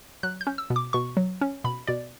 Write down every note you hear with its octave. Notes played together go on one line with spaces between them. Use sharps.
F#3 F#6
G6
C#4
E6
B2
D6
B2 C#6
F#3
C#4
B2 B5
B2 D5